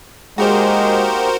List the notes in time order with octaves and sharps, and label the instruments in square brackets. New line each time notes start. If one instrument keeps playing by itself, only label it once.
[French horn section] G#3 [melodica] A#3 D#4 G4 [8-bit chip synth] F#4 A#4 C5